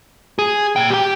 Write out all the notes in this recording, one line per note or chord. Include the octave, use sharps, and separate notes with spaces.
G#4
A#2 G5
G4 G5